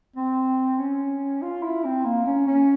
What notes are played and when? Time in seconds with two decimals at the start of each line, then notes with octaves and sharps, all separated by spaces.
0.16 C4
0.79 C#4
1.42 F4
1.63 E4
1.84 C4
2.05 A#3
2.26 C#4
2.47 C#4